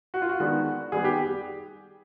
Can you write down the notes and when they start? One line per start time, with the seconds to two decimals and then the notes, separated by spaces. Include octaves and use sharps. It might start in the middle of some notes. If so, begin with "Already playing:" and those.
0.14 F#4
0.22 F4
0.29 F#4
0.40 D#3 G#3 B3 D4 F#4
0.92 D#3 G3 B3 G#4
1.05 G4